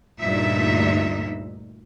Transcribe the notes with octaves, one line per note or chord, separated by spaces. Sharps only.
D2 G2 A#2 D#4 E5